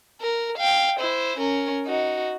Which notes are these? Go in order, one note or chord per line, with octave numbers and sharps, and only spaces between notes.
A#4
F5 G5
E4 C5
C#4 A#4
D#4 F#4